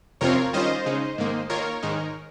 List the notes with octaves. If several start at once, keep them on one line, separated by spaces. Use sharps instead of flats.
F2 C3 F3 C4 F4 A#4 C#5
D#3 G3 C#4 F4 C5 D#5
C#3 G#3 D#4
G#2 D#3 A#3
D#3 A#3 F4 A#4 C#5
G#2 D#3 G#3 D#4